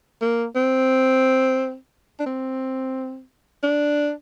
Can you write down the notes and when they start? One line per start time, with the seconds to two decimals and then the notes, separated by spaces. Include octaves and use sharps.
0.21 A#3
0.56 C4
2.19 D4
2.26 C4
3.63 D4